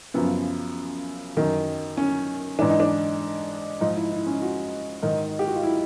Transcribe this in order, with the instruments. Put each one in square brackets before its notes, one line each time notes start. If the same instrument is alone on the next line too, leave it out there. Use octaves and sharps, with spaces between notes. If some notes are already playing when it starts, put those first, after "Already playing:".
[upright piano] F#2 C#3 F3 B3
F#2 D#3
C#4
G#2 E3 D4
D#4
D4
G#2 F3 D#4
E4
E4
C#4
F#4
G#2 D#3
G4
F#4
F4
E4